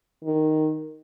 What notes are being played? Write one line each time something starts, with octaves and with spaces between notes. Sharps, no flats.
D#3